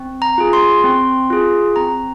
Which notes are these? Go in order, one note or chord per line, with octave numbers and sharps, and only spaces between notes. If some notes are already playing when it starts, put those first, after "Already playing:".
Already playing: C4
A#5
F4 G#4
C6
C4
F4 G#4
C4 A#5